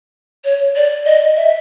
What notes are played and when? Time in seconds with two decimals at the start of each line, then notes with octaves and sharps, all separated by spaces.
0.44 C#5
0.75 D5
1.05 D#5
1.36 E5